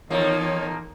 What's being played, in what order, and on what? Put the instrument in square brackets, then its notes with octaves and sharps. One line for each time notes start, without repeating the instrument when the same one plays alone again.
[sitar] E2 F3 A#3 [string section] D#3 D#4 [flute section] C#5